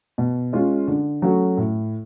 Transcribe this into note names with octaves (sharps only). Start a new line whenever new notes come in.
B2
G#3 C#4 F4
D3
F#3 A3 C#4 F#4
A2